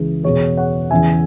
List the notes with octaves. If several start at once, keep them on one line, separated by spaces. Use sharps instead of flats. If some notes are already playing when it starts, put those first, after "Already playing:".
Already playing: C#2 E3 G#4
E2 B2 G#4 C#5
C#5 F#5
E2 C#3 E3 E5 G#5